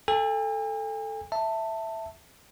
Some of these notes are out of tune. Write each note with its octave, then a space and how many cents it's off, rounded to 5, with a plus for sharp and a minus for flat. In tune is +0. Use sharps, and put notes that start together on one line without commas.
A4 +0 G#5 -45
E5 +0 A5 +15